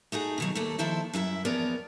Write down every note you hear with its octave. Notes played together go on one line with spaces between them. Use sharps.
A3 D#4 F#4 G#4
B2 D#3 F#3
D#2 A3 A#3 A4
D#3 F3 E4 A4 C5 C#5
F#2 E4 A4 E5
E2 F3 B3 A#4 C#5 D5